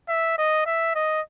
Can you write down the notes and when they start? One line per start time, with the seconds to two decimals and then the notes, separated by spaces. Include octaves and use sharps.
0.08 E5
0.38 D#5
0.66 E5
0.95 D#5